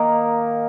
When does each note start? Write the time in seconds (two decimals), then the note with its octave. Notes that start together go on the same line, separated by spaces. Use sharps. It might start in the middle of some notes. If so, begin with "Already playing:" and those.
Already playing: D#3 A#3